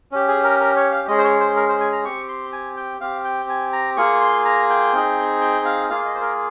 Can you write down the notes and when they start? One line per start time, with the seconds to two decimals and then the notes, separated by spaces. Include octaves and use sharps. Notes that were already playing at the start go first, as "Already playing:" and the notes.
0.12 C#4 G4
0.28 G#4
0.44 A#4
0.60 A#4
0.76 C#5
0.92 F5
1.08 G#3 C#4 G#4 D#5
1.18 C5
1.24 C#5
1.40 C5
1.56 A#4
1.69 C5
1.80 G#5
1.92 A#5
2.04 C4 G4 C#6
2.28 C6
2.52 G#5
2.77 G5
3.01 C4 G4 F5
3.25 G5
3.49 G#5
3.73 A#5
3.97 A#3 F4 G#4 C#6
4.21 C6
4.45 A#5
4.70 G5
4.93 C4 D#4 G#4
5.41 G5
5.65 F5
5.89 A#3 F4 G#4 F5
6.05 D#5
6.15 C5
6.21 A#4